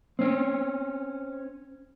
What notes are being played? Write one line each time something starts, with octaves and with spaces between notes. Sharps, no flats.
C4 C#4